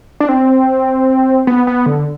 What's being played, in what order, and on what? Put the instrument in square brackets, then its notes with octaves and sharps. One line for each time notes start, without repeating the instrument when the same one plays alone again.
[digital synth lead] D4
C4
B3
B3
D3